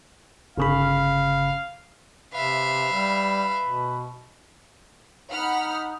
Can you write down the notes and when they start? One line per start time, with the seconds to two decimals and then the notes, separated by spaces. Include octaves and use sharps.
0.57 G1 C#3 F5 B5
2.34 C3 B4 E5 F5
2.92 G3
3.65 B2
5.31 D#4 F#5 B5 F6